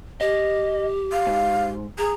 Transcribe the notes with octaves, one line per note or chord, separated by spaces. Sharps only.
G4 D#5
F5
G#2
G#4 A#5